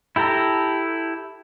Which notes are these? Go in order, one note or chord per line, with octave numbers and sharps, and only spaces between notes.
E4 G4 A4 A#5